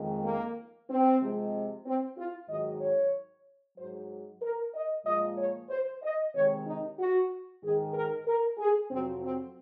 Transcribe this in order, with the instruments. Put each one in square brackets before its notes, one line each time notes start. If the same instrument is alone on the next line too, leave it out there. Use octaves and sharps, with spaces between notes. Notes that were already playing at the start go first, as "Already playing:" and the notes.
Already playing: [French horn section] F2 D#3 G#3
A#3
C4
C3 F3 G#3
C4
F4
G#2 D#3 F#3 D#5
C#5
G#2 F#3 C5
A#4
D#5
A#2 F3 G#3 D#5
C#5
C5
D#5
C3 D#3 G#3 C#5
D#4
F#4
G#2 D#3 G#3 G#4
A#4
A#4
G#4
F2 C3 F#3 C4
C4